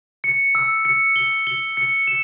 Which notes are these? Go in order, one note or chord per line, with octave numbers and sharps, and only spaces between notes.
C#7
E6
C#7
G7
G7
C#7
E7